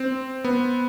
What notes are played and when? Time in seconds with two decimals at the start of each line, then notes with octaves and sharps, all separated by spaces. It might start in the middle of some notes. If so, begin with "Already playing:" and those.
Already playing: C4
0.44 B3